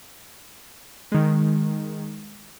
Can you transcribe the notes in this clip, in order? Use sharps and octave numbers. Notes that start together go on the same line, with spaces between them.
D#3 G#3